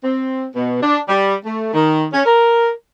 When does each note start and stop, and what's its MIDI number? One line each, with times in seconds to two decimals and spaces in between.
0.03 0.45 60
0.55 0.77 47
0.82 0.98 62
1.09 1.35 55
1.45 1.71 57
1.74 2.05 51
2.12 2.23 61
2.26 2.70 70